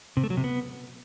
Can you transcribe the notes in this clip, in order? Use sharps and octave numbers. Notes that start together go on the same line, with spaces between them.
C3
A3
F#3
C3
B3